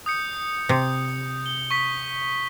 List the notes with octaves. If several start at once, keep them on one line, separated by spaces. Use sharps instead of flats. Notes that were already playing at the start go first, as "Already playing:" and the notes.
D#6 G6 C#7
C3
G7
C#6 B6